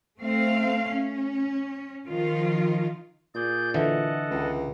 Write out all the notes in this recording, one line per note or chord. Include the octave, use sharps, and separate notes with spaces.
A3 C4 F5
C#4
D#3 F3 F4
A#2 G#4 D5 G6
D3 E3 A4 D#5 F#5
C#2